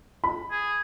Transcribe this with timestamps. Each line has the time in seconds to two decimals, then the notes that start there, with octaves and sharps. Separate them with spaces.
0.24 B5
0.51 G#4